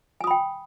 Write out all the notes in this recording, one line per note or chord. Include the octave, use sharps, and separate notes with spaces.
G5 G#5 B5 D#6